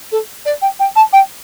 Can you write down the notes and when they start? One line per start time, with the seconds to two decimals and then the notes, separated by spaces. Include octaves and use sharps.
0.12 A4
0.45 D5
0.62 G5
0.79 G5
0.96 A5
1.13 G5